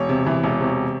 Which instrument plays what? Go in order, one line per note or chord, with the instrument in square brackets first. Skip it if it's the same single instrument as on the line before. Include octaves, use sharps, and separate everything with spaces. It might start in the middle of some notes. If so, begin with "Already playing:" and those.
Already playing: [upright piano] E1 C#5
C3
E3
E1
C3